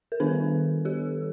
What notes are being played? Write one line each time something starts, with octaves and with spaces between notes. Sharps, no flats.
A#4
D#3 G3 B3 D4 A4 B4
G4 A4